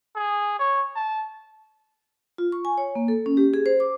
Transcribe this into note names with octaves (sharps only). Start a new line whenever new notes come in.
G#4
C#5
A5
F4
C#6
G#5
C#5
A#3
A4
C#4
G4
G#4
C5
D6